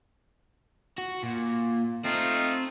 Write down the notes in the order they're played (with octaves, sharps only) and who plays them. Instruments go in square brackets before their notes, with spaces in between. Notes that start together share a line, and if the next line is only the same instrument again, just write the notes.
[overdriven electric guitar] F#4
A#2
[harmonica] A3 D#4 F4 [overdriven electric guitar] C4